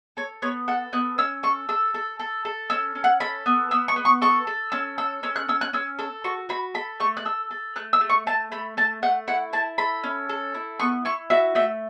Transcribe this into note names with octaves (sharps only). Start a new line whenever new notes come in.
A4 C#5
B3 C#5
A4 F#5
B3 F#6
C#4 E6
A4 C#6
A4 E6
A4
A4
A4
C#4 E6
C#4
F#5
A4 B5
B3
B3 E6
C#6
B3
C#6
A4 C#6
A4
C#4 E6
A4 E6
C#4 E6
F#6
C#4 E6
F#6
C#4 E6
A4 E6
F#4 C#6
F#4 B5
A4 B5
A3 C#6
F#6
A4 E6
A4
A3 F#6
E6
A3
C#6
A3 A5
A3 B5
A3 A5
A3 F#5
E4 F#5
E4 A5
A4 B5
C#4
A4
E4
B3 C#6
E4 C#6
F#4 E5
A3 E5